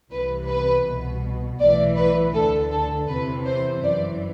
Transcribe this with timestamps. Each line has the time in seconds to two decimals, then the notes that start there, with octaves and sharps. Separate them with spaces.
0.11 C2 C3 E3 B4
0.48 B4
0.85 C2 B2
1.60 B1 A2 E3 D5
1.97 B4
2.34 D2 D3 A4
2.71 A4
3.08 E2 C3 E3 B4
3.46 C5
3.83 G1 F#2 E3 D5